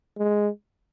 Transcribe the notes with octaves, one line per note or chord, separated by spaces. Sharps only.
G#3